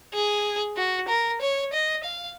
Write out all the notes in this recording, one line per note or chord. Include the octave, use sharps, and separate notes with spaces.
G#4
F#4
A#4
C#5
D#5
F5